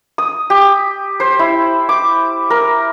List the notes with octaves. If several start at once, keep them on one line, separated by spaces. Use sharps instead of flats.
D#6
G4
C5
E4
D6
A#4